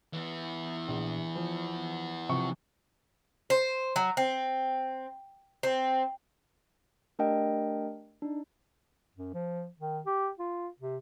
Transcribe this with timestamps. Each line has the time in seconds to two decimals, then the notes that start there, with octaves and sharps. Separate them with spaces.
0.13 E3 B3
0.88 A#1
1.35 F3
2.29 C3 F3 C#6
3.50 C5
3.96 F#3
4.17 C4
5.63 C4
7.19 A3 D4 G4 A#4 D#5 G5
8.22 D4 D#4
9.16 F#2
9.34 F3
9.80 D#3
10.06 G4
10.39 F4
10.80 C3